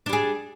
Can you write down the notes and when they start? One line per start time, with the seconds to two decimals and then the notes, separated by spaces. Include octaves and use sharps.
0.06 D4
0.09 G3
0.13 G#4